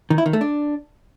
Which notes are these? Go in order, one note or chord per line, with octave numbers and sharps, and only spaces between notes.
D#3
E4
D#3
A3
D4